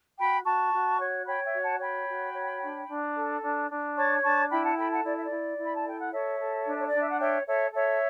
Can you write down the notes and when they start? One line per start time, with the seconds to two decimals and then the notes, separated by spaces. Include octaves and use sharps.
0.19 F#4 G5 B5
0.46 F#4 A5 C#6
0.73 F#4
1.00 C#5
1.26 C#5 G5 B5
1.45 E5 G5
1.54 F#4
1.62 F#5 A5
1.80 C#5 G5 B5
2.07 F#4
2.34 C#5
2.61 D4
2.88 D4
3.16 A4
3.42 D4
3.70 D4
3.96 C#5 A5 C#6
4.23 D4 A5 C#6
4.50 E4 G5 B5
4.64 F#5 A5
4.77 A4 G5 B5
4.90 F#5 A5
5.04 E4 D5
5.14 E5
5.24 D5
5.31 E4
5.57 E4
5.64 B5
5.75 A5
5.84 A4 G5
6.00 F#5
6.11 A4 C#5 E5
6.39 A4
6.65 D4
6.78 C#5
6.88 D5
6.93 D4
6.99 E5
7.09 F#5
7.19 C#5 E5 G5
7.47 A4 C#5 E5
7.73 A4 C#5 E5